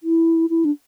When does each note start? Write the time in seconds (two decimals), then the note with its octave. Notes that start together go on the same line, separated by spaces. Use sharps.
0.03 E4
0.50 E4
0.65 D4